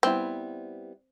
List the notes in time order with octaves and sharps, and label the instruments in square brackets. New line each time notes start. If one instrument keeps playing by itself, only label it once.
[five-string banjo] G3 B3 E4 [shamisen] C4